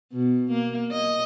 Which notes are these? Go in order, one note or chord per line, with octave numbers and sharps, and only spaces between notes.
B2
A#3
D#5